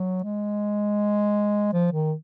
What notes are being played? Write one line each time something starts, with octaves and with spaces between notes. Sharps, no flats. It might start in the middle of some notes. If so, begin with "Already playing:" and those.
Already playing: F#3
G#3
F3
D#3